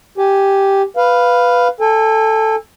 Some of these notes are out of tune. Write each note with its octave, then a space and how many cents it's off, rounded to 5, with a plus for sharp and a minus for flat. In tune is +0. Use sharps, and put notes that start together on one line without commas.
G4 +0 G#5 +0
B4 +0 F5 +0
A4 +0 G#5 -35